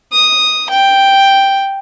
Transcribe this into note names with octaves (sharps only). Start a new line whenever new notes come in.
D#6
G5